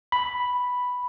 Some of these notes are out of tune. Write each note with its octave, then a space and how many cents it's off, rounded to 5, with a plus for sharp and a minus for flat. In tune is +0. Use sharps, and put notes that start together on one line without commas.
B5 +0